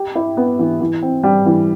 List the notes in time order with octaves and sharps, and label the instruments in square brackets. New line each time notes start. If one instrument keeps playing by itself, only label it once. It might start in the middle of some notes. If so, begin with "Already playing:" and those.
Already playing: [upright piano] G4
E4
B3
E3
E3
C4
G3
E3